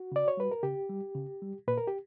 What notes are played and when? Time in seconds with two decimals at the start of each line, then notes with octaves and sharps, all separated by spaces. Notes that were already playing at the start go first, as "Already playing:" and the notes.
Already playing: F#4
0.12 C#3 D5
0.28 C#5
0.37 G3 B4
0.52 A#4
0.63 C#3 G4
0.89 G3
1.15 C#3
1.42 G3
1.68 A#2 B4
1.78 A#4
1.87 G4